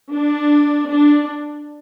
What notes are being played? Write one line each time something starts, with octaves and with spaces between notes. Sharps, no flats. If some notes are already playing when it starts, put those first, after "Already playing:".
D4
D4